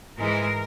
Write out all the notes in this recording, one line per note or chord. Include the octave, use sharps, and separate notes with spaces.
G#2 E3 G#3 A#4